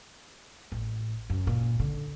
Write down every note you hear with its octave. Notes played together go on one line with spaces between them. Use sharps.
A1
F#2
A#2
D3